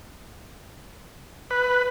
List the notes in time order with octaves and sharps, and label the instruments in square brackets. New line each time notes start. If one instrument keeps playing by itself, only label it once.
[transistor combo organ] B4